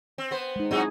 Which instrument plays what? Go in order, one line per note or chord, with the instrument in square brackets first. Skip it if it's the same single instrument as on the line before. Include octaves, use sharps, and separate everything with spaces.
[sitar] C4
B3 C5
[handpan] G#3 D#4
[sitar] F#3 D#4 F#4 [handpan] C4 E4 G#4